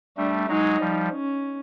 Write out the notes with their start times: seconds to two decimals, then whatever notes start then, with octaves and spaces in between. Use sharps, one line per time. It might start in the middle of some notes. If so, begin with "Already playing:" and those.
0.17 G3 A3 D4
0.48 F#3 G#3 D#4
0.80 F3 G3
1.12 C#4